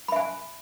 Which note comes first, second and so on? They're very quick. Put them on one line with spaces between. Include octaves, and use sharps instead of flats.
B5 E5 G#5